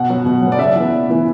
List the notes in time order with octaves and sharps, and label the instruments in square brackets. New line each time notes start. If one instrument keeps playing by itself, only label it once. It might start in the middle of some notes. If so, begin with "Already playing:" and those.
Already playing: [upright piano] B2 F#5
F#3 B3
B2
F#3 B3
D5
C#3 E5
E3 B3
C#3
E3 B3